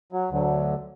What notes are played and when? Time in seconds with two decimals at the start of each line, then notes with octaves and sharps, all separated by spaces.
0.12 F#3
0.30 D2 D3 F#3